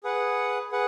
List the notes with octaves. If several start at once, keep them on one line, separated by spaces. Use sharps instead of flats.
G#4 B4 F#5
G#4 B4 F#5